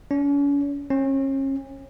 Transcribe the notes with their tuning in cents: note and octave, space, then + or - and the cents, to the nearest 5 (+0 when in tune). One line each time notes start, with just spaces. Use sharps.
C#4 +40
C#4 -35